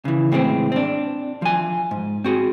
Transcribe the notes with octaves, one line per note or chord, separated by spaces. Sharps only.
C#3 E3
C#2 A2 E3 G#3 B3 C4
C4 D4
F3 G#5
G#2
C4 F#4 G#4